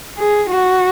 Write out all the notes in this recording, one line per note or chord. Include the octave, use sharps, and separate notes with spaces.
G#4
F#4